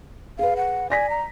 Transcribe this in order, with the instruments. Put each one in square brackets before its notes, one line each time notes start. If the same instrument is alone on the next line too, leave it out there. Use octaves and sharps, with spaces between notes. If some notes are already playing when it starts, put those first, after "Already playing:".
[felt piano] G#4 B4 [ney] F5
[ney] F#5
[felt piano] D5 A#6 B6 [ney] G#5
[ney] A#5